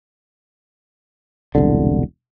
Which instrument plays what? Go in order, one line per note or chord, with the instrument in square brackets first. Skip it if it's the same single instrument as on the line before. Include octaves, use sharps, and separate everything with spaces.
[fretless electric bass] E1 C2 D3